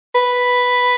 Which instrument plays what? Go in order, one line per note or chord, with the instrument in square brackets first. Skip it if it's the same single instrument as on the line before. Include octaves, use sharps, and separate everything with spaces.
[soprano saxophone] B4